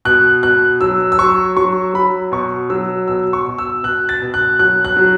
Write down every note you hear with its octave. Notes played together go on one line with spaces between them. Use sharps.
B2 F#6
B2 F#6
F#3 E6
E6
F#3 C#6
F#3 C#6
F#3 B5
B2 C#6
F#3 E6
B2 E6
C#6
B2
E6
B2 F#6
A6
B2
F#6
F#3 F#6
F#6
F#3